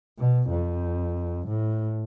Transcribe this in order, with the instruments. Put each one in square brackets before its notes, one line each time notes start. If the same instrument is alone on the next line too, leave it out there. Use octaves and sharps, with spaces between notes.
[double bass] B2
F2
A2